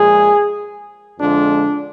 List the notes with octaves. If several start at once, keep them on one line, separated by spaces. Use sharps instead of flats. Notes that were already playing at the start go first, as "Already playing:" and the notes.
Already playing: A#2 F3 G#3 G#4
F2 D3 F3 G#3 D4